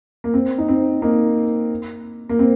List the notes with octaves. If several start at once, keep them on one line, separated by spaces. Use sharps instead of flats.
A#3
C4
D#4
C4
A#3 D#4
A#3
C4